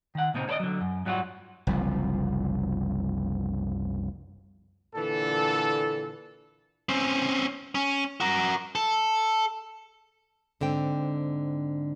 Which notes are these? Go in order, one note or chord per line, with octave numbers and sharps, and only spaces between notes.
D#3 F#5
A#2 C#3 G#3 C4 D#4
C#4 A4 B4 D5 D#5
D3 F#3
F#2
G#2 F#3 G3 C4 F4 F#4
F#1 C2 F3
A#2 D3 E3 A4
C4 C#4
C#4
F#4 A#4
A4
G#2 D3 C4 G5